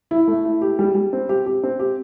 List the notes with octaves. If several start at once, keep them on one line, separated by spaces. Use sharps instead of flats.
E4
A3
E4
G4
G3
G3
C4
G4
G4
C4
G4